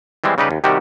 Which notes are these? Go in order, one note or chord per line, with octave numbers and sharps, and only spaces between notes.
E3 G3 G#3 C4
C#3 G3 D#4 G4 B4
D#2
C3 D#3 G3 F#4 G4